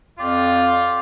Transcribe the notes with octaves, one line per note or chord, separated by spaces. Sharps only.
F2 F4 G4 D5